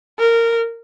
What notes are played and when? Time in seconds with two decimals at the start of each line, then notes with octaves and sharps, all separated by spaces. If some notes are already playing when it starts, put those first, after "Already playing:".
0.19 A#4